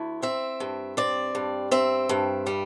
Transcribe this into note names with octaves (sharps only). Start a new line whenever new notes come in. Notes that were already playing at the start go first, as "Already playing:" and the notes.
Already playing: D2 E4
C4 E5
G2
C4 D5
G2
C4 E5
G2
G3